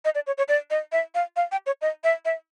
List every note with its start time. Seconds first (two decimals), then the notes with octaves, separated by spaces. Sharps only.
0.05 D#5
0.15 D5
0.27 C#5
0.38 C#5
0.48 D5
0.71 D#5
0.92 E5
1.15 F5
1.36 F5
1.52 G5
1.66 C#5
1.82 D#5
2.04 E5
2.25 E5